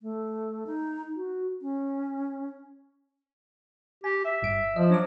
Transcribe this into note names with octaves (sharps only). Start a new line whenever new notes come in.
A3
D#4
F#4
C#4
G4 G#5
E5
G1 G2 D7
F3 D#5
F#3 D4 C#5 D6